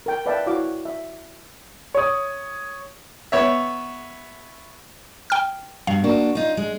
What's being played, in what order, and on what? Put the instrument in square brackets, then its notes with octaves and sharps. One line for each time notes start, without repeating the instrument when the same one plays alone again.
[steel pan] A#4 G5
B4 D5 E5 F5 G5 A5
E4 F#4 C#5 F5 D6
E5
[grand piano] C#5 D#6
[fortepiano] B3 C#5 E5
[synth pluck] G5 F6
[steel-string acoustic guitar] G2 B2 G3 [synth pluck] F5
[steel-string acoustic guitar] A#3 D4 F#4
D#4 F4
G#3